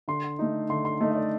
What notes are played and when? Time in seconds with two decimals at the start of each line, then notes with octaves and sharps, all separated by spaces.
0.08 D3 C6
0.39 A3 D#4
0.69 D3 C6
0.85 C6
1.00 A3 D#4 D#5
1.11 D#5
1.15 D5